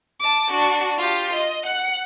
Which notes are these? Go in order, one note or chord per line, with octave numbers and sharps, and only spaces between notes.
A5 D6
D4 F#4
F4 G4
D#5
F#5 F#6